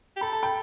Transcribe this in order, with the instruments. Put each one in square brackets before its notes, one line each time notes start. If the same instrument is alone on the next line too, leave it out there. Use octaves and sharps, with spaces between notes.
[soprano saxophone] G4
[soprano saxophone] A4 [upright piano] B5
[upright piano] A5
G5 B5